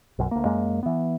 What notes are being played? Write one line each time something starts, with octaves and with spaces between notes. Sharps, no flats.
B1 F#2
D2 A#3
F#2 G#3 A#3
E3 B3